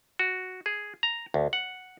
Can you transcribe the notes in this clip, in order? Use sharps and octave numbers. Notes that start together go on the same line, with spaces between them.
F#4
G#4
A#5
D2
F#5